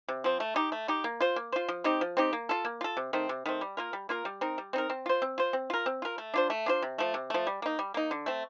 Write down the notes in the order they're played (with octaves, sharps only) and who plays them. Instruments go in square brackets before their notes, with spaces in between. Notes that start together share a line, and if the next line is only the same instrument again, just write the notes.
[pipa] C3
F3 C4
A3
D#4 G4
A3
D#4 G4
A#3
F4 C5
A#3
F4 C5
F3
C4 D#4 G4
F3
C4 D#4 G4
A#3
F4 A4
A#3
F4 A4
C3
D#3 A3 C4
C3
D#3 A3 C4
G3
A#3 F4 A#4
G3
A#3 F4 A#4
G3
C4 D#4 A#4
G3
C4 D#4 A#4
C4
F4 C5
C4
F4 C5
C4
F4 A#4
C4
F4 A#4
A3
D4 F4 C5
A3
D4 F4 C5
C3
F3 A3
C3
F3 A3
G3
A#3 D#4
G3
A#3 D#4
D3
A3 C4